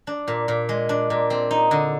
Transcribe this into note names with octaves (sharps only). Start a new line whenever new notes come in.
D4
A#2
A#2
G#3
D4
A#2
C4
D#4
D3